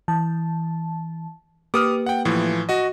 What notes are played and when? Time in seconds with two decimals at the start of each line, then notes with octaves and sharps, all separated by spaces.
0.08 E3 A5
1.74 A#3 G4 B4 D6 D#6 F6
2.06 F#5 G5
2.25 A2 E3 F3
2.69 F#4 D#5